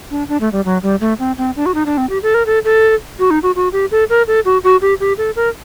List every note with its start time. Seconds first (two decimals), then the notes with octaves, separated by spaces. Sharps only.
0.11 D4
0.29 D4
0.41 A3
0.52 G3
0.65 F#3
0.83 G3
1.01 A3
1.19 C4
1.38 C4
1.56 D4
1.66 F#4
1.74 D#4
1.86 D4
1.97 C4
2.10 G4
2.23 A4
2.34 A#4
2.46 A4
2.65 A4
3.19 F#4
3.31 D#4
3.43 F#4
3.56 F#4
3.73 G4
3.91 A4
4.10 A#4
4.27 A4
4.45 F#4
4.64 F#4
4.82 G4
5.00 G4
5.18 A4
5.36 A#4